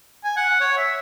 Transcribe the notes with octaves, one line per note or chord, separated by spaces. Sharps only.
G#5
F#5
C#5
E5